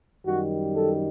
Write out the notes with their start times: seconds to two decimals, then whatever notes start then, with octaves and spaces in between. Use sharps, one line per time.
0.24 F#2 D#3 G3 F#4
0.74 A4